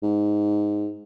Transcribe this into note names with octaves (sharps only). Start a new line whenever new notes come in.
G#2